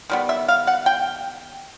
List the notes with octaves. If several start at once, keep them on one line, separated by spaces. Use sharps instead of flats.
D#3 G3 B3
E5
F5
F#5
G5